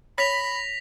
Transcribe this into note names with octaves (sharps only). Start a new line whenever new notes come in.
C#5 B5 A#6 B6 F7